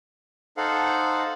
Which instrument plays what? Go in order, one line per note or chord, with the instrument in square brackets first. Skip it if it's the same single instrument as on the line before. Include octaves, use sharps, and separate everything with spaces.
[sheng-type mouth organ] D#4 A4 C5 F5 F#5